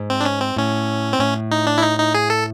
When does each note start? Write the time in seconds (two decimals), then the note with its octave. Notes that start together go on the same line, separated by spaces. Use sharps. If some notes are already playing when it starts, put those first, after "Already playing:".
Already playing: G#2
0.10 C4
0.21 D4
0.25 C#4
0.41 C4
0.56 A2 C#4
1.13 C4
1.19 A2 C#4
1.52 D#4
1.67 D4
1.78 E4
1.82 D#4
1.99 D#4
2.14 G#4
2.30 A4